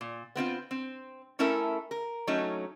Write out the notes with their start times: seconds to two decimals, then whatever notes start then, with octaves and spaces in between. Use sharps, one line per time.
0.01 A#2
0.35 B3 C4 E4 F4
0.71 C4
1.39 A3 C#4 E4 A4 A#4 E5
1.91 A#4
2.27 F#3 A3 C#4 D#4